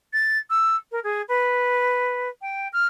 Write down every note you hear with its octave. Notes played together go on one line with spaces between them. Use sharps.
A6
E6
A#4
G#4
B4
G5
F6